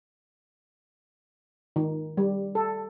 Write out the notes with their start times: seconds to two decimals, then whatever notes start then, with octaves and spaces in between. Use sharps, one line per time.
1.76 D#3
2.17 G3
2.55 A4